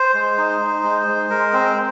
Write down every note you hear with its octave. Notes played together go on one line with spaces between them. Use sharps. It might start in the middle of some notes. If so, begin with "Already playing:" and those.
Already playing: C5
G#3
D#4
D#4
G#3
G#3
G#3 A#4
C4 C5